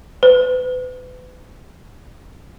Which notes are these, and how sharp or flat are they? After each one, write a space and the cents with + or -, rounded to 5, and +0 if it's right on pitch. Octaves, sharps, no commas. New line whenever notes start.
B4 +35